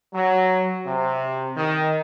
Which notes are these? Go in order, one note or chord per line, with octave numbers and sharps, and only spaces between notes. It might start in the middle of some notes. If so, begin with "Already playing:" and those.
F#3
C3
D#3